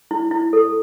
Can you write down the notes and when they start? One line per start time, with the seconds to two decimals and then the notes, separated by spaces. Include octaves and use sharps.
0.11 E4
0.31 E4
0.53 A4